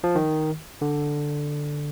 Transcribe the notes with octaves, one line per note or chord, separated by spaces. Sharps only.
F3
D#3
D3